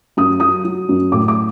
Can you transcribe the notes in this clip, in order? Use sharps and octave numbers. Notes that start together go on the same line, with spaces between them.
F#2 D#6
F#3 D#6
F#3
F#2
A2 D6
D6